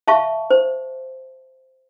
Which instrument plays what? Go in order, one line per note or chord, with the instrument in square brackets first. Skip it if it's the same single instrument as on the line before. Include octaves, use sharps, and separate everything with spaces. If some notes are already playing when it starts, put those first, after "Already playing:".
[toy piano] E5 F5 A5 C#6
C5